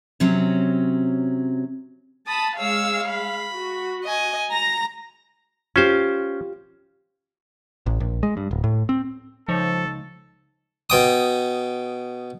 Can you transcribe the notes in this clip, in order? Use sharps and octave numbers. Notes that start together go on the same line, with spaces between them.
C3 F#3 C4 C#4
A5 B5 D#6
G#3 C#5 F5 E6
B5
F#4
D#5 G#5
A#5 A#6
C#4 F4 G4 C5
A1
A#1
G#3
G2
D1
A2
C4
C#2 F3 D#4 A4 C#5
B2 G5 D#6